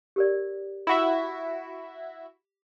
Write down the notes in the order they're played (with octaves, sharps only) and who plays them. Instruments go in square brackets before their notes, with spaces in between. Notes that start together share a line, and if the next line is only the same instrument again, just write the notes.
[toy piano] G4 A#4 D5
[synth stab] E4 F#4 E5